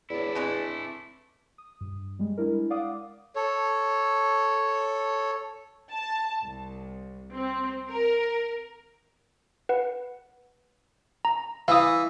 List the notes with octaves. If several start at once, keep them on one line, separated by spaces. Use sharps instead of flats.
E2 D4 E4 C#5 D5
E3 G#3 A3 C4
D#6
G2
G3 G#3
G#3 D4 E4 A#4
D5 F5 F#5 D6 D#6
A4 C#5
A5
C2
C4
A#4
B4 F#5
A#5
E3 F5 D#6